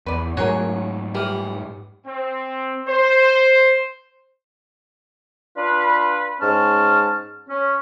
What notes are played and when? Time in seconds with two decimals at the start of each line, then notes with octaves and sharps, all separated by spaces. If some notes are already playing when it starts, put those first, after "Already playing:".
0.06 E2 B4 D5
0.37 G#2 F#3 A3 F#4 G#4 A#4 C#5
1.15 E3 G3 A#4
2.06 C4
2.87 C5
5.57 D4 F4 B4
6.41 G#2 C#4 A5 F6
7.50 C#4